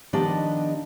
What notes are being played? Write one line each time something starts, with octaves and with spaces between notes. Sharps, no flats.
D#3 F3 B3 D4 G4 D#5